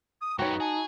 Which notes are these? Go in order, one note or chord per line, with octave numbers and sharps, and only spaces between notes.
D#6
F#2 B3 D#4 F#4 C#5 G5
G#4 A5